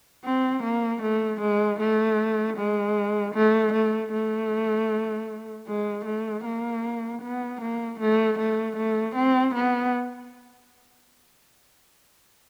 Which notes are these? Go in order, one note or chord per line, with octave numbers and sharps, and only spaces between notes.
C4
A#3
A3
G#3
A3
G#3
A3
A3
A3
G#3
A3
A#3
B3
A#3
A3
A3
A3
C4
B3